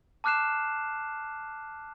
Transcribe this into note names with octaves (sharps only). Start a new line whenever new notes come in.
A5 D6 F6 F#6 C7 E7